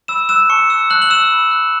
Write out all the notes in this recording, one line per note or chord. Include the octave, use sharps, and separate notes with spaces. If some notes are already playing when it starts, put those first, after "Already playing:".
B5 E6 E7
E6 F#6 E7
A5 C#6 C#7
E6 F#6 E7
A5 F#6 F#7
F#7
E6 F#6 E7
B5
F#6